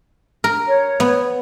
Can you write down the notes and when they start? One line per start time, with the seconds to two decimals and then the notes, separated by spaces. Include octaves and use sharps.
0.44 A#4
0.66 C#5
1.00 B3